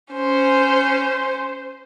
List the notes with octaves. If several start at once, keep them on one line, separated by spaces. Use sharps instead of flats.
C#4 C5